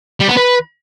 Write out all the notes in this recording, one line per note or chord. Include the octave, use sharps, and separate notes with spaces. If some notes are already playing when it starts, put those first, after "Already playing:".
G3
B3
B4